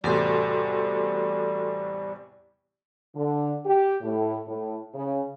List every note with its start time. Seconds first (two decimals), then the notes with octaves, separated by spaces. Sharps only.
0.04 E2 A2 C3 G3 F#4 A4 C6
3.15 D3
3.66 G4
4.02 A2
4.47 A2
4.94 C#3